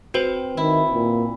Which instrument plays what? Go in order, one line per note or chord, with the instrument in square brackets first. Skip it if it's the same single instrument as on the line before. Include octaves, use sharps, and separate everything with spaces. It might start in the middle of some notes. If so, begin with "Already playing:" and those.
[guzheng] C4 [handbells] F#4 B4 C5
[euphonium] D#3 [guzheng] E4
[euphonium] A#2